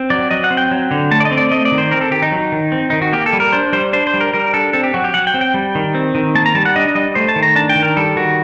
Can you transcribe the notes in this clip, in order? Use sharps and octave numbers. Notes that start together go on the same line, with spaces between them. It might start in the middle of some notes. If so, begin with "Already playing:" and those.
Already playing: C4
F#3 D5
F#3 D#5
F#5
C4
G5
F#3
D3
A3 A5
D5
D#5
C4
D5
A3 D#5
D5
D#3
C5
C4 A#4
A4
D#3 G4
D#4
F#3
D#3
C4
D#3 D#4
F#4
A#3 G4
A4
G3
A#4
D4 C5
G3 C5
D4 C5
C5
G3
A#4
G3 A#4
D4 A4
C4 A4
G4
F#3 F#4
G4
F#3 F#5
G5
C4
G5
G3
D#3
C4
D#3
A#3 A5
A#5
G3 A5
F#5
D4 D#5
G3 D#5
A3 C5
A5
D#3
A#5
D4 A5
G5
D#3
A#4
G3 A4
D#3 F#4